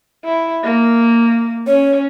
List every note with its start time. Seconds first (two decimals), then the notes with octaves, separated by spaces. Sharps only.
0.25 E4
0.64 A#3
1.67 C#4 C#5